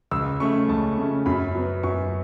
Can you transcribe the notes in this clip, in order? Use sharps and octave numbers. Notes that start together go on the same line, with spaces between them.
C#2 E6
C#3 A3 C#4 C#6
C#2 A5
C#3 A3 C#4
F#2 B5
F#3 B3
F#2 C#6